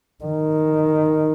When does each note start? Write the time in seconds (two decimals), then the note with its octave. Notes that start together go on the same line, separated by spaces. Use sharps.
0.24 D#3